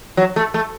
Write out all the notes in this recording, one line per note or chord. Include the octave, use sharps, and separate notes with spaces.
F#3
A3
A3